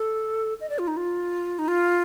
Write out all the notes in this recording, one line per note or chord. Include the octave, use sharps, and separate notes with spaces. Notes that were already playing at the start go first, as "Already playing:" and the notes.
Already playing: A4
D#5
D5
F4
D#4
F4
D#4
F4